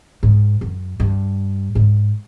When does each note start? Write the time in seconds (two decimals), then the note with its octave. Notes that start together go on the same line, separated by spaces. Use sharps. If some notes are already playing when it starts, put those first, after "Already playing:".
0.23 G#2
0.61 F#2
1.00 G2
1.75 G#2